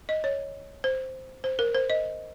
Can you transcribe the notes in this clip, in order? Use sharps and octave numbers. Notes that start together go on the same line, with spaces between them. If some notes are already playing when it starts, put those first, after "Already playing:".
D#5
C#5
C5
C5
A#4
C5
D#5